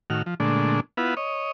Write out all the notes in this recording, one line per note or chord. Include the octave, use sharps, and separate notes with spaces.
A2 D#3 F#4 F6
F3
A#2 D3 G#3 A3 D4
B3 E4 F4 B4 F#5
C#5 D#5